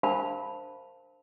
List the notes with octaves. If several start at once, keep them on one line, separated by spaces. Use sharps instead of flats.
D4 A#4 C5 F5 A5 B5